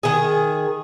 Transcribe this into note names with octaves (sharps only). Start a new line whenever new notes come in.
D#3 G#4